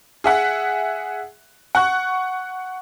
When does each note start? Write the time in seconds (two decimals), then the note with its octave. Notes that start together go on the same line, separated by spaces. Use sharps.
0.24 G#4 E5 F#5
1.75 F#5 C#6 F#6